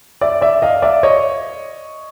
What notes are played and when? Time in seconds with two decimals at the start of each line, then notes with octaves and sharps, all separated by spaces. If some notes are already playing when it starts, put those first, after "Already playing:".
0.21 D5 E5
0.41 D5 E5
0.62 D#5 F5
0.82 D5 E5
1.03 C#5 D#5